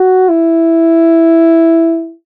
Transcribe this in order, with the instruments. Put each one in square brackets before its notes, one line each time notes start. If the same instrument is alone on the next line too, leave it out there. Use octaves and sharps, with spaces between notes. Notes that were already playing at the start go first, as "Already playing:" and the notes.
Already playing: [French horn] F#4
E4